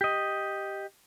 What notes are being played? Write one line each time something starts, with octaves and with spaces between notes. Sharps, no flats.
G4 D#5